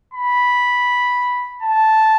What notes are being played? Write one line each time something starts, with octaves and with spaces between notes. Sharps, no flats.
B5
A5